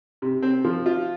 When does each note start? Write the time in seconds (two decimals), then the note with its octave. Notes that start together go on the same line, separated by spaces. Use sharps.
0.22 C3
0.42 C4
0.64 F3
0.86 F4